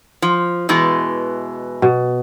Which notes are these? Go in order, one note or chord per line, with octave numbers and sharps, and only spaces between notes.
F3
B2 E3 G#3
B2